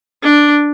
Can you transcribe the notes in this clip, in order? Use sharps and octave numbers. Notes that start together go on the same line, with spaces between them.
D4